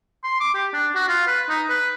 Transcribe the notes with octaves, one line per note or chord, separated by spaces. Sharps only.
C6
D6
G4
D4
F#4
F4
B4
D#4
B4